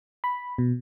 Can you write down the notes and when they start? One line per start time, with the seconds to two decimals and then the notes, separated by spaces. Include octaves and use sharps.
0.24 B5
0.58 B2